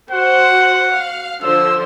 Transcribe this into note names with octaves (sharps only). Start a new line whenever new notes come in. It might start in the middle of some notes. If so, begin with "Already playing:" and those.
F#4 C5 F#5
F5
D3 F3 C5 E6